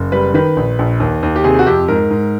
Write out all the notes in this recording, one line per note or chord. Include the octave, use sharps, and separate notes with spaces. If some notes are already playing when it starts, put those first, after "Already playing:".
Already playing: F#1
G3 B4
D#3 B4
A#1
A#1
D#2
D#2
G4
C3 G#4
F#4
F2 G4
G#2 A#4
G#2